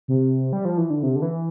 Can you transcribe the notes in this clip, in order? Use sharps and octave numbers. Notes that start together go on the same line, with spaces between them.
C3
G3
F3
E3
D3
C3
D3
E3